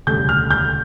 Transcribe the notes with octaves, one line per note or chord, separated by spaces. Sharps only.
E1 D2 C#3 G3 G6
F6
G6